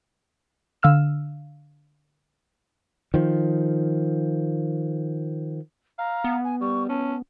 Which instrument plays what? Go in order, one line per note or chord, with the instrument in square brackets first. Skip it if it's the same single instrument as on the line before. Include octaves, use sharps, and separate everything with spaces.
[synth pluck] D3 F5 E6 F6 E7
[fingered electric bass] D#3 F3
[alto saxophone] F5 [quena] A#5
[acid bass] B3
[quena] G#5
[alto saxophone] G3 [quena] C#6
[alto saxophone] C#4 [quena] A5